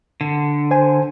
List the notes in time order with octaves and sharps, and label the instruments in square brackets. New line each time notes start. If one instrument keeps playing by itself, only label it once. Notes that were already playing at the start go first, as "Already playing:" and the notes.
[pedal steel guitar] D3
[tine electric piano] C5 G#5